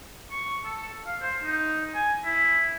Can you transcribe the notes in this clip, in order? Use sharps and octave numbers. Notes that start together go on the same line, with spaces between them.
C#6
A4
F5
C5
D#4
G#5
E4